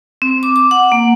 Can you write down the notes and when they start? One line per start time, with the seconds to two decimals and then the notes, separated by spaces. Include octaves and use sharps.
0.22 C4
0.43 D6
0.56 D6
0.71 F#5
0.92 A#3